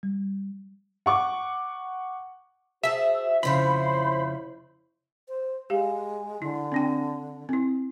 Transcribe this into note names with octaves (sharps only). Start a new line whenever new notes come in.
G3
F#5 C#6 D6
F#4 G#4 C5 E5 A5
F2 C#3 E4 C5 C#5 B5
C5
G#3 G4 F5
D3 E4
C4 D4 G5
C4 E4